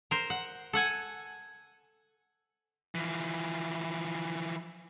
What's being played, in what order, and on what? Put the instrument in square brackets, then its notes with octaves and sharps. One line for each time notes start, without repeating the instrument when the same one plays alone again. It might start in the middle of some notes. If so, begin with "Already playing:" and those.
[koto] A#4 C5
F#5
A4 F#5 G#5
[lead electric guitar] E3 F3